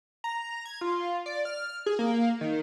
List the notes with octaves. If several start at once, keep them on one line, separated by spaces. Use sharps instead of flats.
A#5
G#6
F4
D5
F6
G#4
A#3
D#3